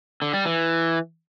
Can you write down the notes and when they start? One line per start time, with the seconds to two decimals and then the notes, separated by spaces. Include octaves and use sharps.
0.22 D3
0.34 G3
0.45 E3